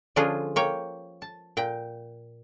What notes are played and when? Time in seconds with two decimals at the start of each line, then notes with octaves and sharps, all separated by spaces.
0.16 D3 F3 C#4 D4 F4 G#4
0.56 A#3 C#5 G5
1.22 A5
1.57 A#2 G5